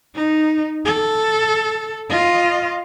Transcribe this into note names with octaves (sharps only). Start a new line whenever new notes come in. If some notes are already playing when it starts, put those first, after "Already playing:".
D#4
A4
F4 D#5